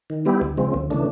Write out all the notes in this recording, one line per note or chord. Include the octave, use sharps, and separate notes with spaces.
D#3
G3 B3 E4 G4
D2
C#3 F3 G#3 C4
D2
C#3 E3 A3 D4